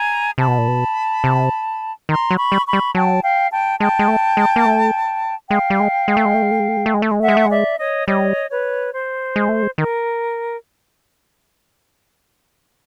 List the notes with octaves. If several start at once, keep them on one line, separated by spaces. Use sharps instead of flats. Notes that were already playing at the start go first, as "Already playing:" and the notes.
Already playing: G#5 A#5
C3 A5 B5
B2
A#2
B2
C3
D#3 A#5 C6
F#3
B5 C#6
G3
B5 C#6
G3
F#3 G5 A5
F5 G5
G5 A5
G#3 G5 A5
G#3
A3
G#3
A#3
A3
G#3 F5 G5
G3
G#3
G#3
A3
G#3
A3
G#3
A3
G#3
A3
G#3
A3
G#3
A3
G#3
A3 E5 F#5
G#3
A3
G#3 D5 E5
C#5 D#5
G3 C#5 D#5
B4 C#5
C5
G#3
A3
G#3
D#3 A#4